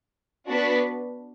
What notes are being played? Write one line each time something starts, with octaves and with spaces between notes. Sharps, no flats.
B3 D4 F#4 B4